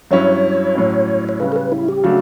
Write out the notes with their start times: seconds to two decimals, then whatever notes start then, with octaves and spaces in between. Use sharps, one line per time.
0.11 G2 F#3 C#4 E4 C#5
0.75 A2 F#3 C#4
1.29 C#5
1.40 C#3 G3 C#4 B4
1.52 A4
1.56 B4
1.72 E4
1.88 G4
2.04 C#3 F#3 A3 D4 F#4